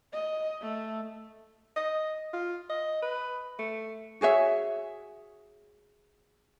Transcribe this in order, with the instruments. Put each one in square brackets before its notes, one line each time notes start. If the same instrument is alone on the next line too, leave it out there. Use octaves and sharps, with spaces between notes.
[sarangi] D#5
A3
[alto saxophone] D#5
F4
D#5
B4
A3
[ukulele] F#4 G#4 C#5 E5